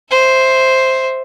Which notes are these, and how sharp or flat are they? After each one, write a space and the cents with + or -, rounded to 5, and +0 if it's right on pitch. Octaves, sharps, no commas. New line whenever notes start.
C5 +0 E5 -5